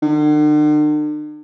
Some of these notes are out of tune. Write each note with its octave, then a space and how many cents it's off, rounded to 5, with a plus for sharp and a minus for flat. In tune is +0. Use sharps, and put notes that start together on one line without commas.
D3 +45